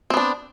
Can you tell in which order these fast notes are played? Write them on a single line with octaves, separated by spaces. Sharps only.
C4 B3 D4